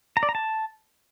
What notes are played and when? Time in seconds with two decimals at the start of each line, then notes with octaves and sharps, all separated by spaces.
0.17 A#5
0.23 D5
0.29 A#5
0.35 A5